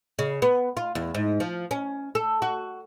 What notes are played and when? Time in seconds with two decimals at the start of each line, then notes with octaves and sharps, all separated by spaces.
0.19 C#3
0.42 B3
0.77 F4
0.95 E2
1.15 G#2
1.40 F3
1.71 C#4
2.15 A4
2.42 F#4